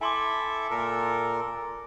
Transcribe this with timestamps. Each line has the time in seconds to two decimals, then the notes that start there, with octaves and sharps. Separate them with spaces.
0.01 E4 A4 E5 G#5 C6 D6
0.71 A#2 A4 A#4